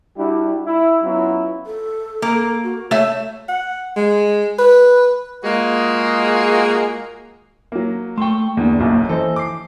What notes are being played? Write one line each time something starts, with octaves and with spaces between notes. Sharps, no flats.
G3 D4 E4 F#4 G4
E4
F#3 B3 C#4 E4 F4
A4
A#3
F#4
A3 C#5 E5
F#5
G#3
B4
G#3 A#3 F4 F#4 G#4 D#5
F#3 A#3
A3 G5 C6 C#6
E2 D3 A#3
F#1 B1 F#2
E3 A4 C5 D#5
D6 C7